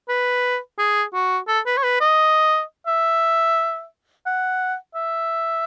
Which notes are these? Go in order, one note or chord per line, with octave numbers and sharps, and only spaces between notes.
B4
G#4
F#4
A4
B4
C#5
B4
D#5
E5
F#5
E5